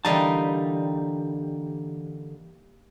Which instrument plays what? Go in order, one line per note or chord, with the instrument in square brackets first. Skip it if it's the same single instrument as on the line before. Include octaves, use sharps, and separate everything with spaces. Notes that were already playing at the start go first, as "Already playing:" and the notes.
[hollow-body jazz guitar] D3 E3 A5 [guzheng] G3 A#3 D#4